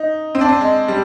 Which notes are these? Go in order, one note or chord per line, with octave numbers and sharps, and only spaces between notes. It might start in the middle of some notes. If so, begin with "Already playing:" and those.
Already playing: D#4
C4
D4
C4
G#3
G3